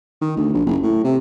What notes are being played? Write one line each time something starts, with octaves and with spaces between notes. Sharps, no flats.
D#3
D2
A#1
F#1
A2
C3